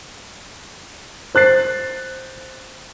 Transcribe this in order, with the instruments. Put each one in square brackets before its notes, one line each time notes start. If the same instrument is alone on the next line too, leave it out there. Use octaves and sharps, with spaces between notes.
[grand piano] C5 F#6 A6 C7